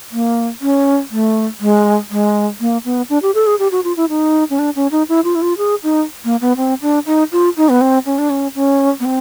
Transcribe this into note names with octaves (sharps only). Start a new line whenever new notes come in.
A#3
C#4
A3
G#3
G#3
A#3
B3
D4
G4
A4
G#4
G4
F#4
F4
E4
D#4
C#4
D4
C#4
D#4
E4
F4
E4
F4
G#4
D#4
A#3
B3
C4
D4
D#4
F4
D#4
B3
C4
C#4
D4
C#4
C#4
B3
C4